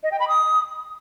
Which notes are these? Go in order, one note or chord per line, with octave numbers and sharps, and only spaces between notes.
D#5
G5
B5
D#6